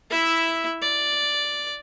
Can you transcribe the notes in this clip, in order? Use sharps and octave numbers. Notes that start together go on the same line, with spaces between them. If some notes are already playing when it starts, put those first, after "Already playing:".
E4 E5
D5